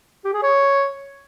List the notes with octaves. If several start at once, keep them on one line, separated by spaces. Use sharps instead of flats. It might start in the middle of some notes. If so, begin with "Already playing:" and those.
G4
G#4
C#5